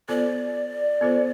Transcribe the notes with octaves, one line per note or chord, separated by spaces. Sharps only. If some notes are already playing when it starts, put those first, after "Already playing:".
B3 F4 A4 C5 D5
B3 F4 A4 C5